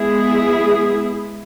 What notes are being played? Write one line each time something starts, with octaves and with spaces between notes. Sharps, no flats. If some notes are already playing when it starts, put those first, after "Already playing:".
Already playing: G#3 B3 E4 G#4